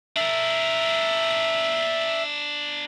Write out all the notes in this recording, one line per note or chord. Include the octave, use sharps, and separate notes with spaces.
D4 A#4 E5